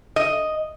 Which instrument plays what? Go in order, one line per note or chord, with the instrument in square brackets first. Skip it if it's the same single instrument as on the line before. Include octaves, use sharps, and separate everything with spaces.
[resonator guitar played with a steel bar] D#5